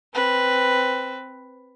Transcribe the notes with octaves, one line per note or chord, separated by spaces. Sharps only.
C4 B4